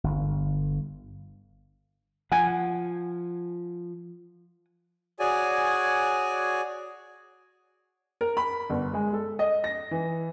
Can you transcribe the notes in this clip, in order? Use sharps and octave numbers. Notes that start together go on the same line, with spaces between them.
G1
F3 F#5 G#5
F#4 G#4 C#5 D5 G#5
A#4
B5
G1
G#3
A4
D#5
A#6
E3